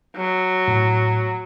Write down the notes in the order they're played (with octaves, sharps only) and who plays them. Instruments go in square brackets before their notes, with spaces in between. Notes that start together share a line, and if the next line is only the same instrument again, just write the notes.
[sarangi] F#3
[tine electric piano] A2